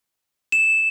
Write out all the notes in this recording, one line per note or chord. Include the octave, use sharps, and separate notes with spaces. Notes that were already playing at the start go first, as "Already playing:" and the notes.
E7